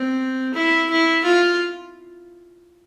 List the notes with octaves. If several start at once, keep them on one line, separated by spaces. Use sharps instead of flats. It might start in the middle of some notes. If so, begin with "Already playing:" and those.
Already playing: C4
E4
E4
F4